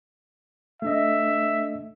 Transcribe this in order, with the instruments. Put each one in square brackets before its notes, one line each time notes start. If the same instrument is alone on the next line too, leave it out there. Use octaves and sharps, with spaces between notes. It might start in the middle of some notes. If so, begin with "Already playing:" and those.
[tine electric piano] A3 D4 D#5 [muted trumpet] E5